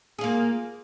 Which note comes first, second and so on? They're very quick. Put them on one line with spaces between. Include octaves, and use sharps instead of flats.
G#4 F4 A#3